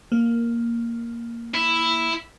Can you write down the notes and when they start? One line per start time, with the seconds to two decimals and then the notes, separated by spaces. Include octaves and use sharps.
0.12 A#3
1.54 E4